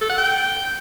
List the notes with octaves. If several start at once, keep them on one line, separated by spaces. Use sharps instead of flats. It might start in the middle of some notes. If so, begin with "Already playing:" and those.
A4
F#5
G5